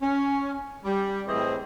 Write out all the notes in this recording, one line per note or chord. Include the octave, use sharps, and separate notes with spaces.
C#4
G3
A2 E3 C4 G#4 C5 D#5